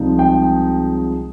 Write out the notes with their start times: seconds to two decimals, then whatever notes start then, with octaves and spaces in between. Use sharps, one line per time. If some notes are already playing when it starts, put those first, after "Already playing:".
Already playing: C2 C3 F3 G#3 D#4
0.19 G5